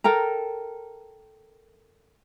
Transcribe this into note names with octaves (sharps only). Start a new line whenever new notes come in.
A4 A#4 G5 A#5